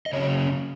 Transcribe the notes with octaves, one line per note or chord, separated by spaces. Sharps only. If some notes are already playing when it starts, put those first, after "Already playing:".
D#5
C#3 F#3 C#4 C#5